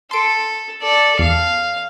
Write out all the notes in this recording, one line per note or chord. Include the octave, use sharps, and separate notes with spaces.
A4 C6 D7
A4 D5
E2 F5